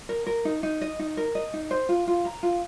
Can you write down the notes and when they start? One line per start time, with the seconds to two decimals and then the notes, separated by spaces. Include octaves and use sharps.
0.09 A#4
0.27 A#4
0.45 D#4
0.63 D#4
0.81 D#5
0.99 D#4
1.17 A#4
1.35 D#5
1.54 D#4
1.71 C5
1.89 F4
2.07 F4
2.25 A#5
2.43 F4